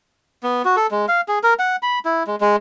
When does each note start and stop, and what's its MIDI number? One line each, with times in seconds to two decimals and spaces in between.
0.43 0.62 59
0.65 0.76 66
0.77 0.87 69
0.91 1.06 56
1.08 1.21 77
1.28 1.39 68
1.43 1.54 70
1.59 1.76 78
1.83 1.99 83
2.05 2.23 64
2.27 2.36 56
2.41 2.56 56